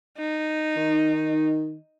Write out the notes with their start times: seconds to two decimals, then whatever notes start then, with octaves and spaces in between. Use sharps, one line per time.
0.18 D#4
0.77 D#3